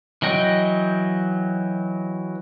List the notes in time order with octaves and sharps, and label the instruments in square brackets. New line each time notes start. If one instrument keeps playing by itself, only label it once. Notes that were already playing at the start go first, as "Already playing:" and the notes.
[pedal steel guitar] E3 F#3 D#5 G5